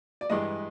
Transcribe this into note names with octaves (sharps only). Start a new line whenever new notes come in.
D5
G2 E3 G#3 D#5